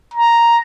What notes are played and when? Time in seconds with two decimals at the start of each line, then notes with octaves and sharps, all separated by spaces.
0.14 A#5